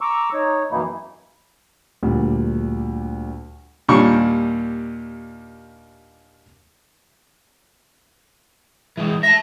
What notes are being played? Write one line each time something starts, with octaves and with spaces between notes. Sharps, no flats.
A#5 C#6 D6 E6
D#4 C#5
F#2 B2 E3 A#3 D#4 E4
D2 A#2 G3
D#2 A#2 G3 D4 C#6
E3 G#3
E5 A5 A#6